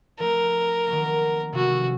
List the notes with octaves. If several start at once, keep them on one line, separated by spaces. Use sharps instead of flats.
F3 A3 C4 A#4
D#3 F#3 A#3
C3 F3 A3 C#4 F#4